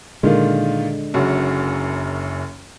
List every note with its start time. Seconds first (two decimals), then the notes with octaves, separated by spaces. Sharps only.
0.23 A#2 D3 D#3 G#3 F4
1.14 F#1 F#2 F#4